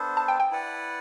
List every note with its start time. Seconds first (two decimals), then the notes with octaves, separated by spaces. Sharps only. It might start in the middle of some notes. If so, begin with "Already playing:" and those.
Already playing: B3 D4 A4 C5
0.17 A5
0.28 G5
0.40 G5
0.51 E4 B4 D5 F#5